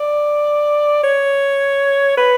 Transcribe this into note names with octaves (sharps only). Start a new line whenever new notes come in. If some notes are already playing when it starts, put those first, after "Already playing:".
Already playing: D5
C#5
B4